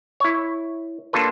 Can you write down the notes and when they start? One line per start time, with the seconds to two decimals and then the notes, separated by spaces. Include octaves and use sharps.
0.20 E4 C#5
1.13 A#3 D4 F4 A4 B4